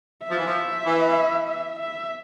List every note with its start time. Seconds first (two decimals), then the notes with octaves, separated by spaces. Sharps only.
0.24 E5
0.30 F3
0.38 E3
0.45 F3
0.86 E3
1.49 E5
1.80 E5